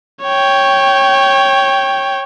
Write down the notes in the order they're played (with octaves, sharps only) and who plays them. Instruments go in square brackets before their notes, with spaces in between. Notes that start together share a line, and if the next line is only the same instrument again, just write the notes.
[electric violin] C#5 G5